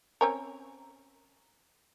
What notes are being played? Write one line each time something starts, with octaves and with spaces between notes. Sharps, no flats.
C4 C#4 A#4